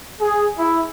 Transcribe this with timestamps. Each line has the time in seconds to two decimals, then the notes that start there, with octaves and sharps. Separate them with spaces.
0.21 G#4
0.58 E4